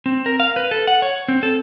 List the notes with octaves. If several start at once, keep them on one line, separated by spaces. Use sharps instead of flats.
C4
A#4
F5
B4
A4
F#5
C#5
C4
A4